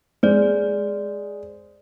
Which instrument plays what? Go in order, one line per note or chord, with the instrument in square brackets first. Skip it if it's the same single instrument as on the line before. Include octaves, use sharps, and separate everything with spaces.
[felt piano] G#3 [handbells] C5 D5